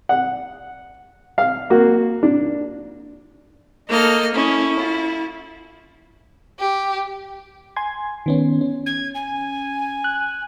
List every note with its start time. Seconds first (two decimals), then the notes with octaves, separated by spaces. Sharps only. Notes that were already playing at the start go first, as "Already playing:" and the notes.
0.09 F#5
1.38 F5
1.70 A#3 F#4
2.23 D4
3.89 A#3 D#4 A4 D#5 F6
4.34 C#4 E4
4.79 F4
6.59 G4
7.76 G#5 C6 G#6
8.26 D#3 B3 C#4
8.61 C#4
8.86 G#6
9.14 G#5
10.04 F#6